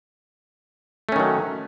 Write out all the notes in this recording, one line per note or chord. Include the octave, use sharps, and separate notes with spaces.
D#3 F#3 A3 C#4